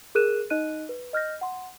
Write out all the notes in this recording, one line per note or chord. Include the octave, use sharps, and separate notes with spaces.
G#4 A#4 F#6 D#7 E7
D#4 D#5 F#6 D#7
B4
D#5 F6 G6 A#6
F#5 C6